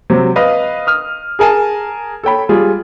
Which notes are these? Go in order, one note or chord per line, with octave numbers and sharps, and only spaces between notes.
C3 F#3 C4
B4 D#5 F5
D#6 F6
G#4 A#4 G#5 A5
A4 C#5 G5 B5
G3 F4 G#4